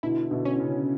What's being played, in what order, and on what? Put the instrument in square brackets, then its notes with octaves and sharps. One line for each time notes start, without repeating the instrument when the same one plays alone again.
[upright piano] B2 D3 [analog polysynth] E4
[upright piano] B2 D3
[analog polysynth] C#4
[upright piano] C#3